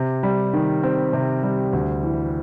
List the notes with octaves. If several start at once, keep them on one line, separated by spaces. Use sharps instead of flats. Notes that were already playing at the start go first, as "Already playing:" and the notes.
Already playing: C3
G3
D#3
C4
C3
G3
D2
E3